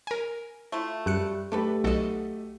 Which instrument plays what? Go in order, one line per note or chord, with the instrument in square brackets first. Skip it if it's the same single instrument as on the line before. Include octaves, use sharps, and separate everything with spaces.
[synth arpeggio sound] A#4 G#5
[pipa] A3 E4 F4
[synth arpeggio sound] F#2 F#6 C#7 [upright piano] G3
[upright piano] A3 G4 [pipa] D4 A4 B4
[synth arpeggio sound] B1 A4 [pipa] F#4 D#5